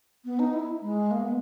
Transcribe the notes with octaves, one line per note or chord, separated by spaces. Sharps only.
B3
D#4
E4
G#3
A#3
B3